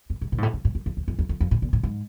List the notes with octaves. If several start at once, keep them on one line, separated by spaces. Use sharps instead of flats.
F#2
G#2
A#2
G#2
A2
G#2
G2
F#2
F2
E2
F2
F2
F2
F2
A2
A#2
A2
G#2